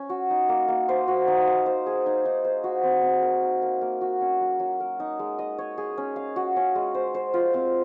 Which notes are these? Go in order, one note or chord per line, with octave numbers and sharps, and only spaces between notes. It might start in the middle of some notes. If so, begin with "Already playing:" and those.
Already playing: C#4
F#4
D#4
A#3
A#3
C5
F#4
D#4
F5
C5
G#4
D#4
D#4
C5
F#4
C4
C4
A#4
D#4
A#3
A#3
F#4
C#4
F#3
F#3
A#4
D#4
G#3
D#5
C#5
G#4
C#4
F5
F#4
C#4
G#3
C5
C5
F4
C4